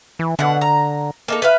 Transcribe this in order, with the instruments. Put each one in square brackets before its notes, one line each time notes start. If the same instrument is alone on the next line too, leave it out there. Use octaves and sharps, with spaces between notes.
[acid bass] E3
[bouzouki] B2 F#5 [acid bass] D3
[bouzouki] A#5
A#3 D#4 A4
B4 E5 F5